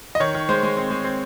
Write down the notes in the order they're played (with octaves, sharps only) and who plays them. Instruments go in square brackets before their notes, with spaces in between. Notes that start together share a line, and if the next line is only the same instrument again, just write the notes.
[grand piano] D#5
D#3 C#5
D#3
G#3 C5
G#3
C4
G#3
C4